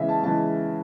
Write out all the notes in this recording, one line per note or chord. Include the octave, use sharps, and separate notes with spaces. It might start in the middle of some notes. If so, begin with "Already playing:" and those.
Already playing: C#3 E3 G#3 D#5 E5
A5
C#3 E3 G#3 A5